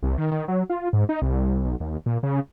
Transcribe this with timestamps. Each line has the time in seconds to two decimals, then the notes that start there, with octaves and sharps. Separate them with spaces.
0.03 C2
0.18 D#3
0.31 D#3
0.48 F#3
0.70 F4
0.93 G#2
1.09 D#4
1.22 C2
1.64 B1
1.80 D#2
2.06 A#2
2.23 C#3